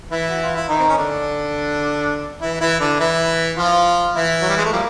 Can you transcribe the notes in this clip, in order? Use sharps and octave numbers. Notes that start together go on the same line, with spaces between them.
E3 E4
F#4
F4
E4
D#3 D#4
C4
C#4
D3 D4
E3 E4
E3 E4
D3 D4
E3 E4
F3 F4
E3 E4
F#3
G3
G#3
A3
F3 G3 A#3